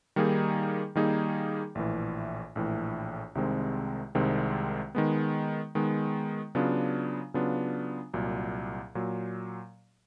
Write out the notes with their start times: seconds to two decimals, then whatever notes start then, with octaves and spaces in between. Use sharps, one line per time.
0.16 D#3 G3 A#3 D#4 G#4
0.95 D#3 G3 A#3 D#4 G#4
1.75 A#1 A2 E3
2.56 A#1 A2 E3
3.35 C2 C3 D#3 G#3 C4
4.15 C2 C3 D#3 G#3 C4
4.95 D#3 G#3 B3
5.75 D#3 G#3 B3
6.55 C#3 F#3 B3 D4 F4
7.34 C#3 F#3 B3 D4 F4
8.14 C2 A#2 F#3
8.95 A#2 F#3